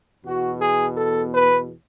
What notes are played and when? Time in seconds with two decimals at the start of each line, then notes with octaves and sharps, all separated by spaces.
0.24 E2 B2 F#4
0.61 G#4
0.97 A4
1.35 B4